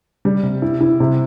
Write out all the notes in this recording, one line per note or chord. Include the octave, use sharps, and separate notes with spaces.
G3
C3
E4
E4
C3